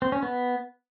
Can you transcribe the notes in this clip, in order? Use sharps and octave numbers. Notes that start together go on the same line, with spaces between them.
C4
C#4
B3